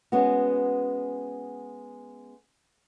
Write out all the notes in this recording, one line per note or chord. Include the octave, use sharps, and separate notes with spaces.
G#3 B3 C#4 F#4